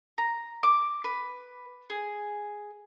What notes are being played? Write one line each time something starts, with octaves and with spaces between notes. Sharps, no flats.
A#5
D6
B4
G#4